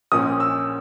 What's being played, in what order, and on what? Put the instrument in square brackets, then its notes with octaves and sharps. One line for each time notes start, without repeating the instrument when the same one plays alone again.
[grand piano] A#1 A#2 F3 A#3 C#4 D#6
E6